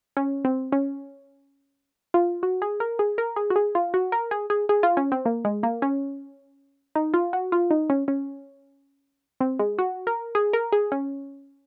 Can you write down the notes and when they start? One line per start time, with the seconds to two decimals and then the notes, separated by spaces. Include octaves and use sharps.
0.17 C#4
0.45 C4
0.72 C#4
2.14 F4
2.43 F#4
2.62 G#4
2.80 A#4
2.99 G#4
3.18 A#4
3.36 G#4
3.50 F#4
3.56 G#4
3.75 F4
3.94 F#4
4.12 A#4
4.31 G#4
4.50 G#4
4.69 G#4
4.83 F4
4.97 C#4
5.12 C4
5.25 A#3
5.45 G#3
5.63 A#3
5.82 C#4
6.95 D#4
7.14 F4
7.33 F#4
7.52 F4
7.71 D#4
7.90 C#4
8.08 C#4
9.41 C4
9.59 G#3
9.78 F#4
10.07 A#4
10.35 G#4
10.53 A#4
10.72 G#4
10.92 C#4